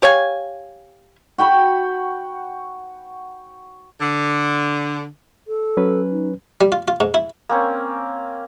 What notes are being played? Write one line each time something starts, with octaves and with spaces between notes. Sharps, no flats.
G4 C#5 F5 G#5
F#4 G5 B5 C#6
D3
A4
F#3 C#4 B4
D#4
G3
F4
F4
G#2
E4
A#3 C4 C#4